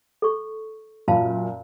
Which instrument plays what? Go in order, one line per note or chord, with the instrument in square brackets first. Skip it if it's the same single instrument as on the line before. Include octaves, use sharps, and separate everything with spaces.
[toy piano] A4 C#6
[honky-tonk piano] F#2 A#2 [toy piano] F5 A5 B5